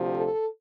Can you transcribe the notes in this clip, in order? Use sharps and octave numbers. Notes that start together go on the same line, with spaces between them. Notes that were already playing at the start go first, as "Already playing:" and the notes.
Already playing: D2 C3 F3
A4